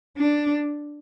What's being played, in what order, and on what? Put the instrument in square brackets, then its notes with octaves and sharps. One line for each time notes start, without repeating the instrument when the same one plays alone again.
[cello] D4